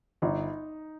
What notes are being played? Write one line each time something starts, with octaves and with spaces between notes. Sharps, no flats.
G1 D#4